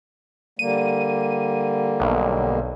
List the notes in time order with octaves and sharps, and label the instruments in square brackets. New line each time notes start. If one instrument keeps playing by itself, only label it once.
[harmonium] D3 G3 A#3 [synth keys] D#7
[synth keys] B1